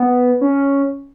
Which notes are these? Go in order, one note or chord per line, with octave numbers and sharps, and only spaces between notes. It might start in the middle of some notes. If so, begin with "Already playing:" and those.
Already playing: B3
C#4